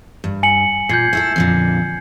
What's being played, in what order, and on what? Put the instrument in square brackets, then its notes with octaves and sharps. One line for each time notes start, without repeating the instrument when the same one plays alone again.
[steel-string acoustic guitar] G2
[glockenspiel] G#5 C#7 F#7
[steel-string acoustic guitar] A#2 [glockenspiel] G6 G#6 C7
[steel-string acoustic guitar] A3 E4 A4
F2 A#2 D3